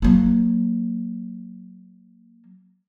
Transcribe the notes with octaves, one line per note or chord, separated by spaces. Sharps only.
F#3 A#3